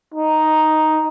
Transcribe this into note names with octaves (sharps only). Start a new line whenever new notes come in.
D#4